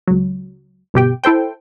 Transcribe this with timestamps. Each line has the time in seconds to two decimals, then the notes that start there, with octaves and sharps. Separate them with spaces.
0.07 C#2 F#3
0.94 G1 B2 G4 G5
1.24 E4 A4 C5 G5